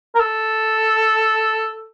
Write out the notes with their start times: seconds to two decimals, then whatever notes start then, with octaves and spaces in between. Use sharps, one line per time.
0.15 A#4
0.20 A4